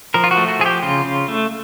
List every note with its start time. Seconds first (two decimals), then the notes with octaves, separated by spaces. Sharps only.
0.14 F3 A#4
0.24 F4
0.31 F#4
0.37 A3
0.48 F#4
0.59 F3 G#4
0.66 G4
0.82 C#3 F4
1.05 C#3
1.28 A3